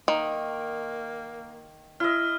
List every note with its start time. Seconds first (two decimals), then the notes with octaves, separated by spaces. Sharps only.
0.08 D#3 A#3
2.00 E4 D#5 F6